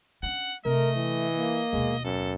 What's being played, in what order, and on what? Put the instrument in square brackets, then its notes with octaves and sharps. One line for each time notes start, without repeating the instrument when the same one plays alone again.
[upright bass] C#4 D4 [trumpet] F#5
[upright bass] C3 [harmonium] A3 [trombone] A#4 [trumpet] D#5
[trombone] E3
[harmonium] A#3
[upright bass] D#2 B2 [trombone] G#3
[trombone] F#2 [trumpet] A4